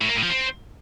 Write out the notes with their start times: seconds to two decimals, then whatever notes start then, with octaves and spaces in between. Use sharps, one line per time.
0.02 A2
0.09 A#3
0.16 A2
0.23 F3
0.30 C4